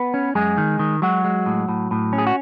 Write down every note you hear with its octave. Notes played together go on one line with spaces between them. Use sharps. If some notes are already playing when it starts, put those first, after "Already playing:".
Already playing: B3 B4
C#4
F#2 G#3 G#4
D#3
D#3
F#3 G#3 F#4
G#3
A2
A2
A2
C#4
G#4
F#4